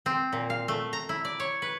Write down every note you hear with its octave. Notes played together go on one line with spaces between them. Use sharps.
C4
A#2
F5
A3
A#5
E4
D5
C#5
B4